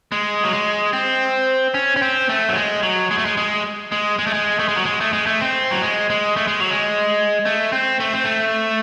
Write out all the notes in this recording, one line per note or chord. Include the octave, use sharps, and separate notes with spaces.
G#3
F#3
G#3
C4
C#4
C#4
C4
A3
F#3
G#3
F#3
G#3
A3
G#3
G#3
G#3
G#3
A3
G#3
A3
G#3
F#3
G#3
A3
G#3
A3
C4
F#3
G#3
G#3
A3
G#3
F#3
G#3
A3
C4
A3
C4
A3